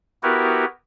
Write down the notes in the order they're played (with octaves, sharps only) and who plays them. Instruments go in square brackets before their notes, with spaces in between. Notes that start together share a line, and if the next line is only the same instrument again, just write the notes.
[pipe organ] B3 E4 F#4 G4 A#4 B4